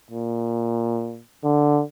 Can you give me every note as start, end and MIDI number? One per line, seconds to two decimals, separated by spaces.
0.11 1.21 46
1.44 1.82 50